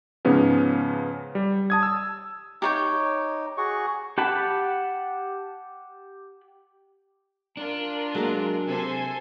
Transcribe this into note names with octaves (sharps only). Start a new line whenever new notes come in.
G#2 C#3 F3 B3 C#4
G3
A5 D#6 G#6
E6
D#4 G4 C#5 G5
F#4 G#4 C#6
G4 F#5 A5 B5
D4 F4 A#4
F#3 G#3 A#3
C3 A4 C5 G#5